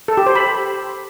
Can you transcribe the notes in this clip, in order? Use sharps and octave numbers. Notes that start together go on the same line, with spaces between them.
A4
G4
C5
B5